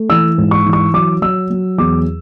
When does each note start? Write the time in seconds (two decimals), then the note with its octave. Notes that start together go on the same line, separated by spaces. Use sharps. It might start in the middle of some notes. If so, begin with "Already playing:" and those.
Already playing: A3
0.10 E3 E6
0.38 G#2
0.51 C#6
0.66 E3
0.73 C#6
0.94 F#3 D6
1.22 F#3 E6
1.50 F#3
1.78 E2 D6